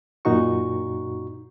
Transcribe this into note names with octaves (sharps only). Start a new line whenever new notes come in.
F#2 A#2 D#4 F#4 C#6